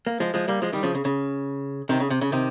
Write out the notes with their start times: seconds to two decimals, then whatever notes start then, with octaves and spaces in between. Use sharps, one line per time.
0.07 A#3
0.20 F3 G#3
0.34 F3 G#3
0.48 G3 A#3
0.62 F3 G#3
0.73 D#3 G3
0.83 C#3 F3
0.95 C#3
1.05 C#3
1.89 C3 D#3
2.00 C#3
2.10 C3
2.21 C#3
2.32 C3 D#3